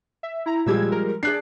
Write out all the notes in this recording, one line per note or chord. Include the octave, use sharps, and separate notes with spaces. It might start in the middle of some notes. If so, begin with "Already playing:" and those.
E5
E4 A#5
A#2 F3 G3 G#3 E6 G#6
A#4
D4 G#4 D5 F#6 C7